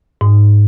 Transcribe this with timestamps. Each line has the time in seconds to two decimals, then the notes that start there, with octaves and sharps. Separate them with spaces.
0.21 G#2